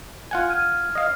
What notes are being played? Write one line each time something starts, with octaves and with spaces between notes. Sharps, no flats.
F4 F#5 G#5
F6 G#6 D#7
D#5 F5